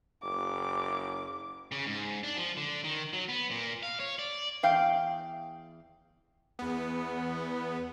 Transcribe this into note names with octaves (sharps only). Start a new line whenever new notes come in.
F#1 D6
C#3
G#2
D4
F3
D3
D#3
F#3
B3
A#2
F5
C#5
D5
E2 F5 G5
E2 B3